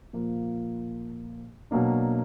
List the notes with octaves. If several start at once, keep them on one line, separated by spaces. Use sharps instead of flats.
A#2 F3 A#3
B2 F#3 A#3 D4